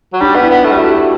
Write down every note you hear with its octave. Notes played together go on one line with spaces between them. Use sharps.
F#3
G3 D4
B3
E4
B3
A3
G3
A3 F#4
G4
F#4